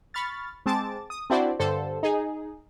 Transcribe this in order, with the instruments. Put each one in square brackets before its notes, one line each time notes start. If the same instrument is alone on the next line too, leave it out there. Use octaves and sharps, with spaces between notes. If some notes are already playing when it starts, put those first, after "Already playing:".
[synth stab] B5 C#6 F6 A6
G#3 C4 A5 D6 A6
D#6
C4 D4 E4 F#4 C5 D5
G2 D3 A4 C5
D#4 G#4